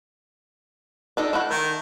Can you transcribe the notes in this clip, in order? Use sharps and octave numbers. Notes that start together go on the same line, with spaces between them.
D4 D#4 A4
A3 E4 F#5
D#3 A3